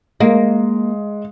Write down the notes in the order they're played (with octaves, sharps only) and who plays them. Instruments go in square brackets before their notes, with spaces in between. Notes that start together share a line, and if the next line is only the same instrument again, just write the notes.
[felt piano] G#3 [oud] A#3